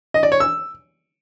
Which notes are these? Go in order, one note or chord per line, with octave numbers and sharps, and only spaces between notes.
D#5
D5
C#5
E6